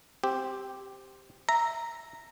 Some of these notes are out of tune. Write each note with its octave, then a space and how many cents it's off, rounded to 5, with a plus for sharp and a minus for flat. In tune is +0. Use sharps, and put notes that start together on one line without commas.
C4 +0 G4 +0
E5 +0 A#5 -10